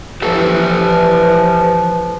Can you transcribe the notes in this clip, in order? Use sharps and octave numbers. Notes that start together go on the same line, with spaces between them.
E3 F3 G4 A4 B4